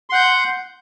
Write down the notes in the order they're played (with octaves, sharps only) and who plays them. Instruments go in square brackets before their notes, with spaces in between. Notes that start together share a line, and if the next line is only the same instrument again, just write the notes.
[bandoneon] C6
F#5
G6